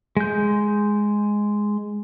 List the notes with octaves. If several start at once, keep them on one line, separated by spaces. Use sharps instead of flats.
G#3 G6